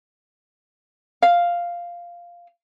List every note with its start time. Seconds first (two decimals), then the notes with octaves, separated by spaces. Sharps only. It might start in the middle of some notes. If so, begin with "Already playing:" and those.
1.22 F5